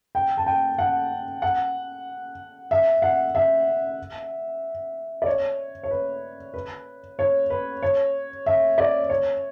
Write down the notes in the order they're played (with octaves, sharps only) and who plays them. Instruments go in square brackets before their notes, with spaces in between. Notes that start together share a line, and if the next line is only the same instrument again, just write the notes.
[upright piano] G5
A5
G5
F#5
F#5
E5
F#5
E5
D5
C#5
C#5
B4
B4
C#5
B4
C#5
E5
D5
C#5